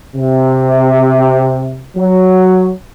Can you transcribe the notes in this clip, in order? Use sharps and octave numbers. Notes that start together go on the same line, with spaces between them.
C3
F#3